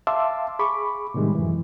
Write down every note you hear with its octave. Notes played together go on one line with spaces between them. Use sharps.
E5 F5 A5 C6 D6 E6
G#4 B5 C#6 D6
A2 C3 D#3 G3 G#3
F#2 E3